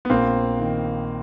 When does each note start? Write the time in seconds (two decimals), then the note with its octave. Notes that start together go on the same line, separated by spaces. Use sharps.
0.05 B3
0.10 A#1 A#3 C4
0.60 D#3